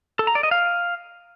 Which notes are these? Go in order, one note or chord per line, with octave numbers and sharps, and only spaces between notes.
A4
A#5
D5
D#5
F5